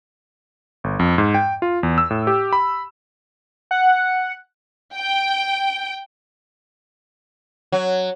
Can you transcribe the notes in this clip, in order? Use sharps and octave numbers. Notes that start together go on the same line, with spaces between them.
G1
F2
G#2
G5
F4
E2
E6
A2
G4
B5
F#5
G5
F#3